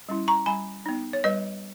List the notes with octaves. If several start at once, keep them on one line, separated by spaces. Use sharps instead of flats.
G3 C#4 E4
A#5 C#6
G3 G#5 B5
B3 D#4
C#5
G3 B4 D#5